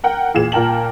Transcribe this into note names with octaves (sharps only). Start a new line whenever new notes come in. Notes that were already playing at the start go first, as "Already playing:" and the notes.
A#4 F#5 G5
E2 A#2 G#4 E7
A#2 A#4 G5 A5 F#7